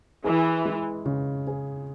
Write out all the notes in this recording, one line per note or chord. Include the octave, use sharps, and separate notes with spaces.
E3 G#4
G#3
C#3
G#4